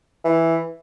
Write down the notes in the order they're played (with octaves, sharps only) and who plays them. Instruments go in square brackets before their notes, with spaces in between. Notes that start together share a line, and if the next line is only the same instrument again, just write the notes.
[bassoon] E3